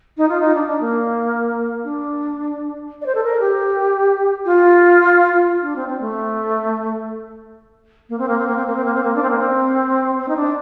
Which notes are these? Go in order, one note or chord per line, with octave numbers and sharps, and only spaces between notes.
D#4
F4
D#4
D4
D4
A#3
D4
D5
C5
A4
A#4
G4
F4
D4
C4
C4
A3
A#3
C4
A#3
C4
A#3
C4
A#3
C4
A#3
C4
A#3
D4
C4
A#3
C4
C4
D#4
D4